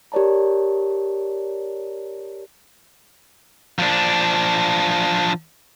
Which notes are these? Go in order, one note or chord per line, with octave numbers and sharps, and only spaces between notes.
G4 A#4 C#5 D5 A5 A#5
F3 D4